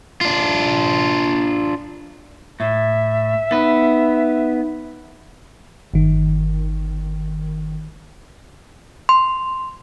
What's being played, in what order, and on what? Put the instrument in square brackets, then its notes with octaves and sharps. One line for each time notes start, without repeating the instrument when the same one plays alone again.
[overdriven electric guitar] D4 F4
[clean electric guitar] A2 [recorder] E5
[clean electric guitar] B3 B4 [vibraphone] D#4
[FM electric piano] G1 D#3
[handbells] C6